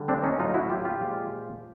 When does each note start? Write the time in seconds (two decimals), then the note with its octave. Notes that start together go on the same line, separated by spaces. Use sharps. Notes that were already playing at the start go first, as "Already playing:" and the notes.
Already playing: D3 G3
0.08 C4 D4
0.23 C#4 D#4
0.39 A2 F#3 D#4 F4
0.54 E4 F#4
0.70 F4 G4
0.85 F4 G4
1.01 A#2 F3 G#3